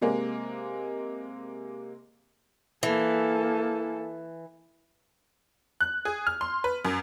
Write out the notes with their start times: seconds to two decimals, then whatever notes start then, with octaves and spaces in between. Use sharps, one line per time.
0.01 C3 G#3 A#3
2.83 E3 A#3 A4
5.81 F#6
6.05 G#4
6.27 F6
6.41 C6
6.64 B4
6.85 F#2